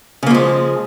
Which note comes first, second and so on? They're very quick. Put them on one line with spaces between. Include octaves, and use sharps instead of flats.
C#3 A#3 F3 G#3